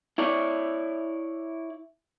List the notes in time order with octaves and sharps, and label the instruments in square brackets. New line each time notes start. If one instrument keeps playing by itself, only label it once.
[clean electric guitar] E4 C#5 D5